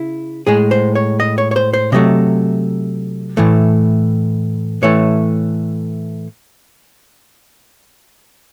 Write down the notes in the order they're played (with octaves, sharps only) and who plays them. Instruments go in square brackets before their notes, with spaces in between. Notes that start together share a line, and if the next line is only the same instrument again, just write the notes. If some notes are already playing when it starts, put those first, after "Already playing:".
Already playing: [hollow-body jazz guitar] C#3 E4
A2 G#3 G#4
C5
C#5
D#5
C#5
C#5
C5
C5
C3 F#3 A3 D#5
A2 E3 A3
A2 E3 A3 C#5